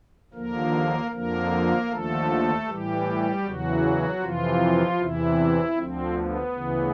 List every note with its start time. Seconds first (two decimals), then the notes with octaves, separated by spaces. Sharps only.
0.33 D#2 D3 F3 A#3 A#4
1.11 F2 D3 F3 A#3 A#4
1.88 D#2 D3 F3 A3 A4
2.66 A2 E3 G3 G4
3.43 E2 C#3 E3 F#3 F#4
4.20 F2 C3 E3 F3 F4
4.97 E2 C3 E3 E4
5.75 D2 D3 F3 C4
6.14 B3
6.52 D2 C#3 E3